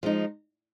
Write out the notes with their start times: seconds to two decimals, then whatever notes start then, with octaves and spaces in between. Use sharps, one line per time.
0.03 F3 G#3 D#4